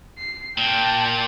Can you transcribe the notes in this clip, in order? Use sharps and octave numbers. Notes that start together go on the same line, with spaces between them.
C7
A#2 G5 A5